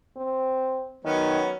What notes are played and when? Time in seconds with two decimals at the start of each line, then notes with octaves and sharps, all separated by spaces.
0.17 C4
1.05 D#3 F#3 B3 C#4